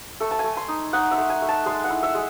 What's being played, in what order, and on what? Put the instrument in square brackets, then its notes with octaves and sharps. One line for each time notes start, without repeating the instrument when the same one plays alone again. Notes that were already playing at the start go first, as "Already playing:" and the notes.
[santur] A3 A4
A5
A3 G#5
C6
D#4
D#4 F#5
E5
A3
G#5
A3
A5
G#3 C6
F#5
E4
E5
G#3